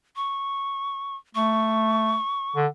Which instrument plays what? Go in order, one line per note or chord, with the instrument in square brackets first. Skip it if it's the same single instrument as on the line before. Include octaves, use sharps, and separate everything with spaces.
[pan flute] C#6
[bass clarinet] A3 [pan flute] C#6
[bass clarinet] D3